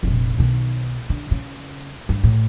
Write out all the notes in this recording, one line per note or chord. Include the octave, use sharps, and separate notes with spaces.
F1 A#1
B1 D#3
D3
C#3
G2
A1 A2